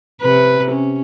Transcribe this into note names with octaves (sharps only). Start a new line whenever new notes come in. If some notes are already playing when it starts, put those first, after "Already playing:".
C3 B4
C#4